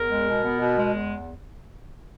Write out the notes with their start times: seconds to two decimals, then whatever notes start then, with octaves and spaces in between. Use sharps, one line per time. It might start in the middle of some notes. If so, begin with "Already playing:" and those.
Already playing: E2 A#4
0.09 G#3
0.26 B2
0.43 B3
0.59 B2
0.76 G#3
0.93 E2